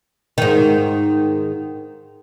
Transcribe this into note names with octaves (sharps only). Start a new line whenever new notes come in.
G#2 D#3